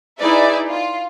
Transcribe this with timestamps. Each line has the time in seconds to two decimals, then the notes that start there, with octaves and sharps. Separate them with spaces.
0.20 D#4 E4 G#4 B4 D5 E5
0.71 F4